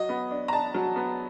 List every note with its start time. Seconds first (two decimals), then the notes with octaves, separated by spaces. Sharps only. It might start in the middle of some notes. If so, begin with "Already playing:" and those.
Already playing: F#3 D#5
0.09 B3
0.31 D4
0.48 A#5
0.53 D4 A5
0.74 F#3
0.96 B3